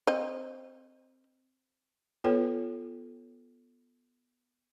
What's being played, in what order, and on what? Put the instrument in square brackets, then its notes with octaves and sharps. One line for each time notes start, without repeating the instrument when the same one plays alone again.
[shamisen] C4 D#5
[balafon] B3 F4 A4 B4 C#5 G5